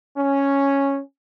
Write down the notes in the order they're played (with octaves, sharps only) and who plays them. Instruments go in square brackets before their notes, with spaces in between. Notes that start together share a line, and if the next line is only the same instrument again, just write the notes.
[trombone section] C#4